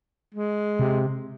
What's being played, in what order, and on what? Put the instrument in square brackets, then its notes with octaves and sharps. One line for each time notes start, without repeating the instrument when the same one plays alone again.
[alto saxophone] G#3
[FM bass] C3